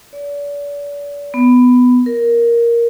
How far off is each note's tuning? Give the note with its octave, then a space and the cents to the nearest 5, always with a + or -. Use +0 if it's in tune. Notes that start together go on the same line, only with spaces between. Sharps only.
D5 -40
B3 +10
A#4 +5